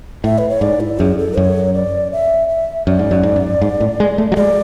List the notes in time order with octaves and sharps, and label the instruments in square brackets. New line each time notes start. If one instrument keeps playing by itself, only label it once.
[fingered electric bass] A2 [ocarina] E5
[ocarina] B4
C#5
[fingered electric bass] G#2 [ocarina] D5
[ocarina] E4
[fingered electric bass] F#2 [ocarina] G#4
[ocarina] A4
[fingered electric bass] F#2 [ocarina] C#5
[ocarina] D5
E5
E5
[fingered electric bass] F#2 [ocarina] D5
[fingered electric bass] G#2
F#2
G#2
F#2
G#2
A2
G#3
A3
F#3
[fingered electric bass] G#3 [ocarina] D5